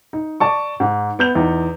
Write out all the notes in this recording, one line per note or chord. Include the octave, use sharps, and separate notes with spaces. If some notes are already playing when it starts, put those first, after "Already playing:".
D#4
D5 A5 C#6
G#2
B3 G6 F7
E2 D#4